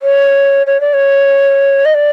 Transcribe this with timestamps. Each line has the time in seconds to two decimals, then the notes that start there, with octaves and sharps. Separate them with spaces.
0.03 C#5
0.67 C#5
0.81 D5
0.94 C#5
1.85 D#5
1.94 D5